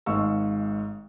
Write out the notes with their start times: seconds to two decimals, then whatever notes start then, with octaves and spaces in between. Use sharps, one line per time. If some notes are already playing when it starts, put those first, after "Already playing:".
0.06 G#1 G#2 G#3 F5 C#6 E6